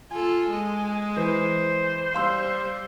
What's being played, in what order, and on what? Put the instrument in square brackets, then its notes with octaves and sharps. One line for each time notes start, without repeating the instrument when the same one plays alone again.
[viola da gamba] F4 A4 [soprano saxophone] G#5
[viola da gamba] G#3
[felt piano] E3 [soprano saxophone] C5
[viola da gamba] G3 [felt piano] F5 C6 E6